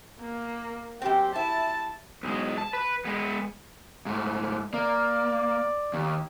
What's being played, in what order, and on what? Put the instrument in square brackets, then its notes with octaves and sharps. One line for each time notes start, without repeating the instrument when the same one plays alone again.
[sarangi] A#3
[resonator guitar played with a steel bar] F#2 C4 [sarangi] G4
[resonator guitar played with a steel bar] E4 [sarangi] A5
[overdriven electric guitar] B1 G#3
A5
B4
G#3 B3
[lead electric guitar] G#2 A3
[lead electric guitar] A#3 [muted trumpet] D5
[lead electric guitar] D#2